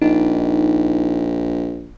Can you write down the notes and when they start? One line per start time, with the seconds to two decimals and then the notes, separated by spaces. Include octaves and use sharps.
0.02 A#1 D#4